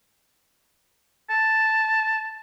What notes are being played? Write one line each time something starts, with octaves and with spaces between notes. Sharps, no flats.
A5